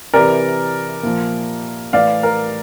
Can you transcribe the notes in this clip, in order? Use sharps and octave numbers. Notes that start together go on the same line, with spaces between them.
C3 E3 A#4 D5
A#2 F3
A2 E3 D5 F5
A#4